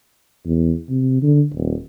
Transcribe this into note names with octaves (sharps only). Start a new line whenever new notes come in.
E2
C3
D3
D#1